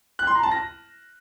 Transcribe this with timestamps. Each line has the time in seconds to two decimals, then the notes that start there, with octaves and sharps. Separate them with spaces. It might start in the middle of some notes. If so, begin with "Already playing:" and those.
0.19 F#6
0.27 C6
0.35 A#5
0.43 A5
0.51 A#6